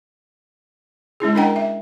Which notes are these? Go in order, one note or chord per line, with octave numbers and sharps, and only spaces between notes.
G#3 C#4 E4 G#4
D4 A#4 D#5 F#5 G5 A#5
E5